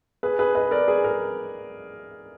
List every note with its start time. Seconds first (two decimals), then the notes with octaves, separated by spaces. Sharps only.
0.23 G#4 B4
0.39 G#4 B4
0.55 B4 D#5
0.71 A#4 D5
0.87 G#4 B4
1.04 A#4